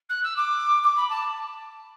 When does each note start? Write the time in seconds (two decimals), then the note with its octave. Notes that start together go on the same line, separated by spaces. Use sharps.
0.09 F#6
0.23 E6
0.36 D6
0.83 D6
0.97 B5
1.10 A5